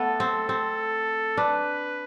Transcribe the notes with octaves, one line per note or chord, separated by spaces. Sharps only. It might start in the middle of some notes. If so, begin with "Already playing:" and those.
Already playing: A3 B3 A4
C4
C4
D4 B4